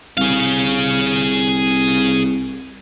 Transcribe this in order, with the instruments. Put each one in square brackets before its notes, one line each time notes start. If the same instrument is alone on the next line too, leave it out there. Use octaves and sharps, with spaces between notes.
[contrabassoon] C2 [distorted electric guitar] G#4 F5